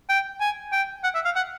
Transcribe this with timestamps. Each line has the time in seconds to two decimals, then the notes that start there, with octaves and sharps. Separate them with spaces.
0.09 G5
0.41 G#5
0.72 G5
1.04 F#5
1.15 E5
1.25 F5
1.36 F#5